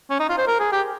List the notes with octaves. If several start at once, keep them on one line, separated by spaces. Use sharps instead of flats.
C#4
D#4
F4
C5
A#4
G#4
G4